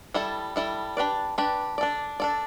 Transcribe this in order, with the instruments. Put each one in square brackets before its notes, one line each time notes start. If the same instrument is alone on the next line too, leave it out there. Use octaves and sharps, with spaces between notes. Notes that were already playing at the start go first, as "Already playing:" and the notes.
[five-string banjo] G3 E4 A4
G3 E4 A4
D4 G4 B4 D5
D4 G4 B4 D5
D4 A4 D5
D4 A4 D5